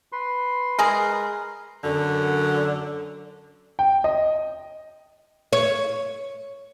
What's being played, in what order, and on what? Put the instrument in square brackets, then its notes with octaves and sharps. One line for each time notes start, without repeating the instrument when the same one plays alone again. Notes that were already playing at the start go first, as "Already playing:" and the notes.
[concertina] B4 C6
[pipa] G#3 G#4 A#4
[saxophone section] F#2 D3
[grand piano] G5
D#5
[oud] C#5